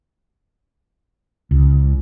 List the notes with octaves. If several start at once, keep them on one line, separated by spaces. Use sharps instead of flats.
C#2